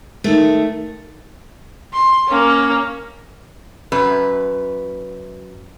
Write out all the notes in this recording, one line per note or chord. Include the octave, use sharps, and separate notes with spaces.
D#3 A3
C6
A#3 C#4
F#2 B4